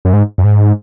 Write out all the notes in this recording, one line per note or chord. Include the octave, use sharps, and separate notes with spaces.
F#2
G#2
F#2
G#2